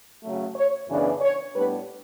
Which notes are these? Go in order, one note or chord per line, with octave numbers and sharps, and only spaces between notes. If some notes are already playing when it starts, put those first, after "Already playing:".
C#3 F#3 A3
C#5
F#2 C#3 E3 B3 D4
C#5
A2 G3 B3 D4 B4